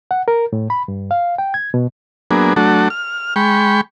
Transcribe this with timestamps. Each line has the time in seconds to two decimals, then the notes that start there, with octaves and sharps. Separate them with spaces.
0.11 F#5
0.28 A#4
0.53 A2
0.70 B5
0.88 G2
1.11 F5
1.38 G5
1.54 G#6
1.74 B2
2.31 F#3 A#3 B3 D4 G#4
2.56 F#3 A3 D4 F#4 A4
2.90 F6
3.36 G#3 G5 B5 C#6